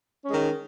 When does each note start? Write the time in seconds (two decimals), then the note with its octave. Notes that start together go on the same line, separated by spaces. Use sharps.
0.24 C#4
0.29 G#3
0.33 D#3